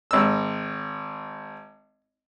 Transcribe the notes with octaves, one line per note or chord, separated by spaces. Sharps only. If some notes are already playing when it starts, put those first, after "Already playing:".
G#1 E6